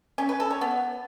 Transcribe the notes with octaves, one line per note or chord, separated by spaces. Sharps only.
C#4
B4
A4
C#5
B3